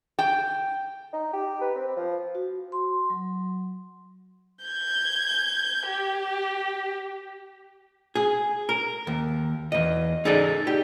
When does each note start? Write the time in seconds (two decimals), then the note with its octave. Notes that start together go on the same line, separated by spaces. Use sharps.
0.19 G5
1.13 D#4
1.33 G4
1.61 B4
1.75 C4
1.96 F3
2.35 F#4
2.72 C6
3.10 F#3
4.65 G6 G#6
5.88 G4
8.15 G#4
8.69 A#4
9.07 D#2
9.72 E2 D#5
10.25 D#4 G#4 A4 D5 D#5
10.67 G4